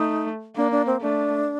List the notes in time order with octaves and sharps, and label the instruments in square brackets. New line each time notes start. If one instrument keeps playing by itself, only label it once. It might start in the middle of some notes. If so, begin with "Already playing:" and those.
Already playing: [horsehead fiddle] A3 [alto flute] D#4
[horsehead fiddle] A#3 [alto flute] D4
[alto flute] D4
C4
[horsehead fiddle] A3 [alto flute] D4